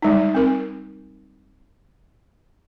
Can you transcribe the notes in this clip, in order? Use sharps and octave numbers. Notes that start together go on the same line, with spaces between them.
G3 G#3 D#4
C4 A#4